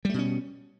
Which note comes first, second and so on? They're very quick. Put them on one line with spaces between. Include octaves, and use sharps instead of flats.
G3 A3 B2 C#4